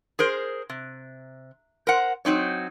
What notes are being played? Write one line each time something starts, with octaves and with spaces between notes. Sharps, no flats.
G#4 A#4 C5
C3
A#4 C5 F#5
F#3 C4 D#4 C#5